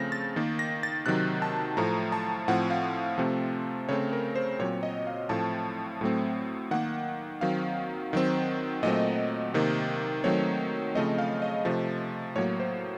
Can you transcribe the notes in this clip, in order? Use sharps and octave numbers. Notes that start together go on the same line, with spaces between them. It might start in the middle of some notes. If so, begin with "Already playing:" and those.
Already playing: C#3 F3 A3 C4 A#6
A6
D#3 A#3
A#6
A6
C3 D#3 F#3 F#6
A5
A2 F3 A3 A#5
A5
A2 F3 C4 F#5
F5
C3 F3 A3 C4
C#3 A3 C4 C#5
A#4
C5
A#2 F#3 C4 C#5
D#5
F5
A2 F3 A3 C4 A5
A2 F#3 A3 C4
D#3 A#3 F#5
D#3 F#3 C4 F5
D#3 F#3 C4
A#2 F#3 A3 C4 D#5
C3 D#3 A#3
D#3 F#3 A3 C4 C#5
C#3 F3 A3 C4 D#5
F5
D#5
C3 F3 A3
A2 F#3 A#3 C#5
C5